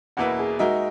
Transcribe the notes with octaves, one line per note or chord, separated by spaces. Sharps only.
E2 B2 A#3 E4 B4 F#5
G#4
G#3 D#4 F#4 A#4 E5